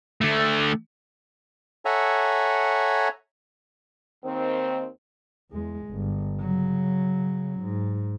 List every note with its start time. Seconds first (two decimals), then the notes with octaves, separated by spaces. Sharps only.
0.21 D3 A3
1.85 A4 C#5 E5 F#5 G#5 A#5
4.23 D#2 D#3 C4
5.52 E2 G#3
5.88 G1
6.39 C#3 F#3
7.61 G#2